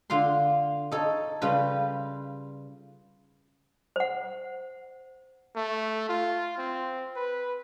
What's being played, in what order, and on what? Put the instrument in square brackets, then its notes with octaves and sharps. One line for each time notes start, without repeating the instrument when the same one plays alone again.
[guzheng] D3 F4 F5 C6
D#4 A4 C#5
C#3 G3 F4 B4
[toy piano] C5 F#5
[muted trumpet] A3
F4
C4
B4